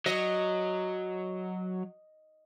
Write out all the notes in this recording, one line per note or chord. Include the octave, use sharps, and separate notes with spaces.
F#3 D#5